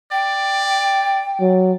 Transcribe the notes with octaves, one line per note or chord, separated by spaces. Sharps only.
D5 G5
F#3